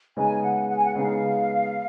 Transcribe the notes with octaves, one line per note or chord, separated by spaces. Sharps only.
C#3 G#3 B3 D#4 G#5
F#5
F#5
G#5
F#5
C#3 G#3 B3 D#4 F5